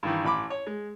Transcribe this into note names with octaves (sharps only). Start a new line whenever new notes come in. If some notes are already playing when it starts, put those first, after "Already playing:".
G2 D#3 E3
A1 B5 D6
C#5
G#3